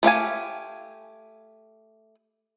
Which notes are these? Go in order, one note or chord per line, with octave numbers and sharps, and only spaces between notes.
A3 G4 F5 G#5